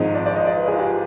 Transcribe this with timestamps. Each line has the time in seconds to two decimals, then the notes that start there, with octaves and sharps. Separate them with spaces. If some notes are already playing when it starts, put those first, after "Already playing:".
Already playing: G#1 G#2 F3 C4 D#5
0.15 D5
0.26 D5
0.36 D#5
0.47 D5
0.57 B4
0.68 G#4
0.73 F4
0.79 G4
0.89 F4